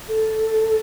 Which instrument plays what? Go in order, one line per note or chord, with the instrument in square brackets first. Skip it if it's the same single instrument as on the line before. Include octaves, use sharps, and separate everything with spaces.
[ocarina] A4